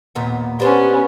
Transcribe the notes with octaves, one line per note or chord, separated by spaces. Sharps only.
D#2 A#2 B3
B3 C#4 D4 G4 C5